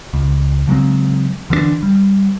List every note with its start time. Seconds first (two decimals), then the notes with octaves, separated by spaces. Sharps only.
0.14 C#2
0.67 C#3 F#3 G#3 C4
1.50 D3 E3 A3 D4
1.83 G3